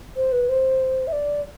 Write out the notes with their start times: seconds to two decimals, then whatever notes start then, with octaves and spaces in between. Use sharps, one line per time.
0.16 C5
0.32 B4
0.49 C5
1.07 E5
1.12 D5